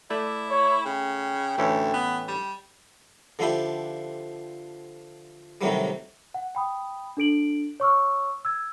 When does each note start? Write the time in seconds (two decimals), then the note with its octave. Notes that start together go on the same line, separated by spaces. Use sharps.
0.10 A3 E4 D5
0.50 C#5
0.85 C#3 G5
1.58 A1 D2 E3 C#4
1.94 B3
2.28 G3
3.39 D3 F3 D4 E4 G4
5.61 A2 C3 D#3 F#3 G3
6.34 F#5
6.55 G5 B5 D#6
7.17 D4 A4 D7 F#7
7.80 C#5 C#6 E6 F6
8.45 E6 G#6